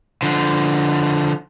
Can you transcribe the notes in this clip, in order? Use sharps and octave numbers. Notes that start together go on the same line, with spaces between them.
D3 F3